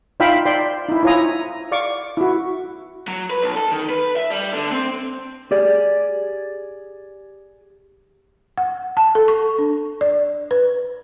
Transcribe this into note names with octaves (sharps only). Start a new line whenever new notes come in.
D#4 F4 E5 F5 G5 B5
D5 G5 C6
D#4 E4
E4 F4 C#5 G#5 A#5 D#6
D5 F5 C#6 D6
E4 F#4
F#3
B4
B1
A4
D#3
B4
E5
G3
D3
C4
G4 G#4 D5
F#5
A5
A4
C#6
D4
D5
B4